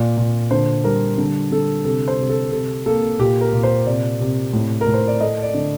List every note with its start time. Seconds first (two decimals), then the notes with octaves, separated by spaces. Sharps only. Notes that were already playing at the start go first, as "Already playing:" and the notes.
Already playing: A#2 D5
0.17 A#2
0.51 D3 C5
0.84 G3 A#4
1.18 D3
1.52 D3 A4
1.85 C3 A4
2.08 C5
2.19 C3
2.30 A4
2.52 C3 A4
2.86 A#3 A4
3.19 A#2 G4
3.41 A#4
3.53 A#2
3.63 C5
3.86 C3 D5
4.20 C3
4.53 A2
4.81 A#4
4.86 A2
4.94 C5
5.08 D5
5.20 A3 D#5
5.42 D5
5.54 D3